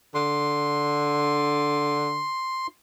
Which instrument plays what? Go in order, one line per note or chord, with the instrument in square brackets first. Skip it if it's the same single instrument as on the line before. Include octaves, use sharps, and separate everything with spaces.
[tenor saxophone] D3 [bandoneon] C6